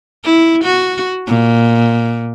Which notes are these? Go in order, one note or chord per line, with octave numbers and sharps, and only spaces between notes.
E4
F#4
A#2